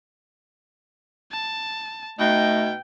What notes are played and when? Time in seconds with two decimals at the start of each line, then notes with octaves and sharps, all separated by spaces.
1.32 A5
2.19 B2 A3 D#4 G5